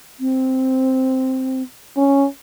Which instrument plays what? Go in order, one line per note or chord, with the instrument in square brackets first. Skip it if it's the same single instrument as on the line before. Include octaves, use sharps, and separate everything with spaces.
[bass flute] C4
[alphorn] C#4